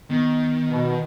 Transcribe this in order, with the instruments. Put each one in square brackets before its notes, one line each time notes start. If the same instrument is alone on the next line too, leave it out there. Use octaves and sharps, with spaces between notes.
[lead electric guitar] D#3 [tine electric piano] B3
[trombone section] B2